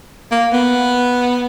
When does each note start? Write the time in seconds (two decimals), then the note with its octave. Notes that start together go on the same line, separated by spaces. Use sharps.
0.32 A#3
0.53 B3